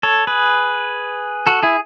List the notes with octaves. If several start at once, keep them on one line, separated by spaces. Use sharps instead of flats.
A4 C#5
G#4 B4
F#4 A4
E4 G#4